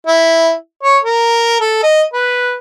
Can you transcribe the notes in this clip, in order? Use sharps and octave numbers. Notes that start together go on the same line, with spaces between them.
E4
C#5
A#4
A4
D#5
B4